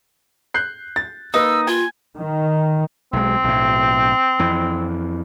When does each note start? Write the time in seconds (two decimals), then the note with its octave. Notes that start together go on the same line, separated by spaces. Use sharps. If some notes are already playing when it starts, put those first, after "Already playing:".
0.54 F#6 G6 C7
0.96 A6
1.34 A#3 D#4 B4 E6
1.67 F4 G#5
2.17 D#3
3.13 B1 G#3 C4
3.44 B1 A2
4.39 F2 E3